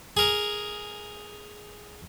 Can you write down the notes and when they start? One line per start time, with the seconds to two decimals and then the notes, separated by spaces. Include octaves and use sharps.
0.17 G#4 A#4